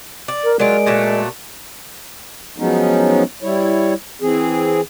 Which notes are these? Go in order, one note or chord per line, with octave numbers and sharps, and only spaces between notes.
D5
A#4
F#3 G#3 F4 A#4 D5 D7
A#2 F#3 A3
F3 F#3 G#3 B3 C#4 D#4
G3 E4 C#5
E3 C4 G#4